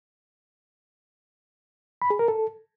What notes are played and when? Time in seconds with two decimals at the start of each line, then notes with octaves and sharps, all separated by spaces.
2.02 B5
2.10 G#4
2.19 A#4
2.28 A4